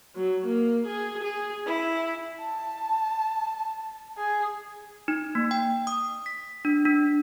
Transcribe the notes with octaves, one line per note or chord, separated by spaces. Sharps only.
F#3
A#3
G#4
G#4
E4
A5
G#4
D#4
A#3
G5
D#6
B6
D4
D4